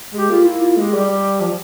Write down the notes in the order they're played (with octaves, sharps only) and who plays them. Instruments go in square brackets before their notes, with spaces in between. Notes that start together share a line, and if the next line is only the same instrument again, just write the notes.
[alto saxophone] G#3 [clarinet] G4
[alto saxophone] A#3 [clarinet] F4
[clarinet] E4
F4
[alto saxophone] G#3 [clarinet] G4
[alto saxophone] G3
F3